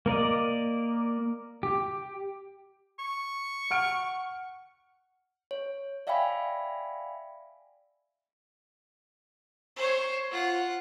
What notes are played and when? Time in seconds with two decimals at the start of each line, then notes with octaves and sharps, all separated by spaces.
0.06 A#3 A#4 D5 D#5
1.63 G4
2.99 C#6
3.71 F#5 F6 D7
5.51 C#5
6.07 D5 E5 F5 G5 G#5 B5
9.76 C5 C#5
10.31 F4 F#5